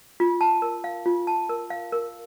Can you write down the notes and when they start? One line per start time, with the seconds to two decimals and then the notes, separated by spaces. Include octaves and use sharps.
0.20 F4
0.41 A5
0.62 A#4
0.84 F5
1.06 F4
1.27 A5
1.49 A#4
1.70 F5
1.92 A#4